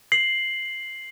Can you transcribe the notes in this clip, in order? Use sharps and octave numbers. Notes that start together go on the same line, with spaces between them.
C7 F#7